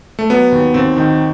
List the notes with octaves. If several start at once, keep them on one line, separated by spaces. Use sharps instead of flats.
A3
F#3 B3
D#2
D#2 C4
D#3